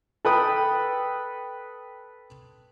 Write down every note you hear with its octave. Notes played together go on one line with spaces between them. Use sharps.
A4 B4 G5 D#6